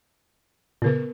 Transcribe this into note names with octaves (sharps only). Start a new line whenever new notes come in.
A#2 C#3 B3 A#4 B4